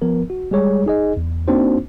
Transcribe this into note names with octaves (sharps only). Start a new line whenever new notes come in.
F3 B3 A#4
F#4
G3 G#3 G#4 C#5
D#4 G#4 D#5
E2
A#3 C4 D4 D#4 F#4 C5